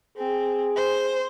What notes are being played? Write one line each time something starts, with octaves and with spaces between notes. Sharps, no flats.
C4 G#4
C5